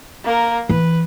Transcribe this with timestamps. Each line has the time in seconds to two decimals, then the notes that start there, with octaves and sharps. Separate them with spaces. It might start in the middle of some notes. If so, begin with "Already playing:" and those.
0.24 A#3 A#4
0.69 E3 B4